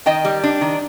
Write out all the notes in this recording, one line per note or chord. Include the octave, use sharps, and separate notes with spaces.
D#3 D#5 G5
G3
D4
D#3